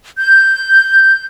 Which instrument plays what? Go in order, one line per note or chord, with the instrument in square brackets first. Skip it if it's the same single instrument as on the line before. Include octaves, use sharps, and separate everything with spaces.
[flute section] G6